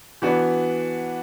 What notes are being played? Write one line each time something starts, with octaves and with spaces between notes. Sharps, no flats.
E3 B3 D4 F#4 B4